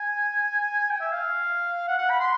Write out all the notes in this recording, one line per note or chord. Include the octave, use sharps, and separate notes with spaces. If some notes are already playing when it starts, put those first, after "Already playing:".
Already playing: G#5
G5
E5
F5
F#5
F#5
B5
C6